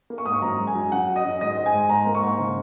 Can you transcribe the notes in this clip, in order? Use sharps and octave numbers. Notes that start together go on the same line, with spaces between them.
A#3
C#6
G#2 D#6
C#6
F#2 A#5
G#3
G#5
F#2
F#2 F#5
F#3
D#5
F#2
G#2 D#5
G#2
G#5
G#3
G#2 A#5
A#3
C#6
G#2
C#3